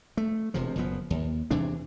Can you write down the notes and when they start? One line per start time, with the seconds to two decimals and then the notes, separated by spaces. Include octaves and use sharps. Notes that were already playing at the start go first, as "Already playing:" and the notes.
0.17 A3
0.54 E1 C3 F3
0.76 F#1 F3 B3
1.10 D#2
1.51 E2 C3 E3 D4